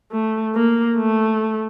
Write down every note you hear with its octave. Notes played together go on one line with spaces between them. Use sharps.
A3
A#3
A3